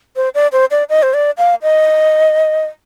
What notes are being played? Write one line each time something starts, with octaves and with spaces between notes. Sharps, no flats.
C5
D5
C5
D5
D#5
C5
D5
F5
D#5